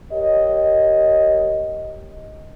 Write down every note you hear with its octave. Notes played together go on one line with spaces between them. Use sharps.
G4 A#4 C#5 D#5